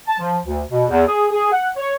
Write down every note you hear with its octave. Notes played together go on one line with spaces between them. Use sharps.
A5
F3
D2
B2
E2
G#4
G#4
F#5
C#5